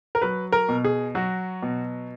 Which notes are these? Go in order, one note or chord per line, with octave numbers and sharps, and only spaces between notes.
A#4
F#3 B4
A#4
B2
G#4
F#3 F#4
B2